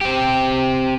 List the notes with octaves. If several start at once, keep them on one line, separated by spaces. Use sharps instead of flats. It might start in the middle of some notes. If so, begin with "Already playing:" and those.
C4 G4